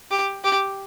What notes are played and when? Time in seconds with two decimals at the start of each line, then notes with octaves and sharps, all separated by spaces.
0.11 G4
0.44 G4